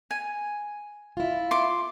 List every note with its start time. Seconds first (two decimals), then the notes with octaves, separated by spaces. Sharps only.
0.11 G#5
1.17 E4 F4
1.51 C6 D6